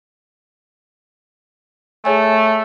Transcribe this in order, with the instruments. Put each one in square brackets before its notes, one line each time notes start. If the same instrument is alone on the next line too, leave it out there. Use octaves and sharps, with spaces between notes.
[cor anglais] A3 [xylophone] G#4 C#5 G#5